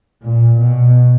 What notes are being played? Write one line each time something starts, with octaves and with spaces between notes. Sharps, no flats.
A#2
B2